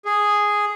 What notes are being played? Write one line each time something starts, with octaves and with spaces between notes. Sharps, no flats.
G#4